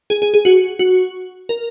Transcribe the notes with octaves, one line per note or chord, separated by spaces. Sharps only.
G#4
G#4
G#4
F#4
F#4
A#4